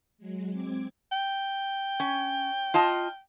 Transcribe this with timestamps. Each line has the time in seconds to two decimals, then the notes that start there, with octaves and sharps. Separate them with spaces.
0.18 F#3 G#3
0.52 C4 D6 G#6
1.12 G5
2.00 C#4
2.74 F4 D#5 A5